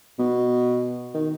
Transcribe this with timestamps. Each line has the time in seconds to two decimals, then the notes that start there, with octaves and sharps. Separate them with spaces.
0.19 B2
1.14 D#3